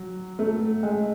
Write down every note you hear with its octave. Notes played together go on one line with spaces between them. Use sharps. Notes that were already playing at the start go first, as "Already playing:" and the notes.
Already playing: F#3
A3
G#3